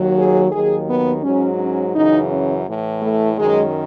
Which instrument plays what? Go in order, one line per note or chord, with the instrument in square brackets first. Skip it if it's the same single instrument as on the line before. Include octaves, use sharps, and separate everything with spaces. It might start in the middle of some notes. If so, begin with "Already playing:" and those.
Already playing: [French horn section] D#2 D#3 F#3
G#4
D#2 D#3 F#3 G#4
B3
G#2 F#3 C#4
C#4
F#2 C#3 E3 D#4
C#4
A2 E3
A3
F#2 D#3 F#3 G#3